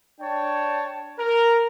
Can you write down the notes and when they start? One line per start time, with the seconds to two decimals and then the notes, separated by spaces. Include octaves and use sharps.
0.21 D4 C#5 G5 A5
1.19 A#4